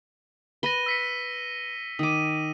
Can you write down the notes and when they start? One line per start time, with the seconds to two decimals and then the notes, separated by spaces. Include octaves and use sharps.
0.63 B4 B5 A#6 D#7 G7
0.86 E6 B6 C#7
1.99 D#3 D6 D#6 D#7